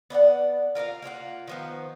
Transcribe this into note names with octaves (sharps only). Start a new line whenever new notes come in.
B3 D5 F5 F#5
F4 A#4 D5 F5
A#3 F4 F#4 F#5
D#3 F3 B3